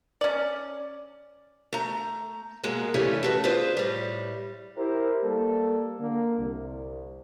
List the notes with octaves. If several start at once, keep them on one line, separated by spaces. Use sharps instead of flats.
C#4 D5
A3 A#5
G#2 B2 G#3 A#3
F2 C#3 E3 G3 A3 C#4
A3 F#4 B4
F4 G#4 B4 C5 D5
A2 G3
E4 G4 A#4 C5
G3 A#3 A4
D3 A#3
C2